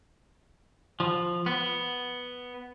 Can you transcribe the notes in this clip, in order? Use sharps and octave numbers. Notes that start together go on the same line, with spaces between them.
F3
B3